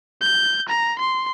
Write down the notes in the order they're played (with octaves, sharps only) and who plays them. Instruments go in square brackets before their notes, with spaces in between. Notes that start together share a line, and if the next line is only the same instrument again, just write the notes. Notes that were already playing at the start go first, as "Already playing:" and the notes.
[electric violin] G6
A#5
C6